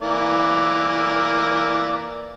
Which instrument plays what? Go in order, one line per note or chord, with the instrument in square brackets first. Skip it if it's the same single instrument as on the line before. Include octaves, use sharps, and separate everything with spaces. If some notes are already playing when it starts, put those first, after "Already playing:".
[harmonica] E3 A#3 D5